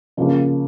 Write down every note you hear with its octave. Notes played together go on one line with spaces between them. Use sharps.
C#3 F3 A#3 C#4